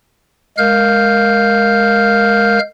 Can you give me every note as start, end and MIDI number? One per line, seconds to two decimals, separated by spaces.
0.58 2.59 56
0.58 2.59 70
0.58 2.59 77
0.58 2.59 89
0.58 2.59 91